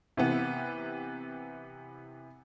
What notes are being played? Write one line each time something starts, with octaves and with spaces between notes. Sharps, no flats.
C3 E3 B3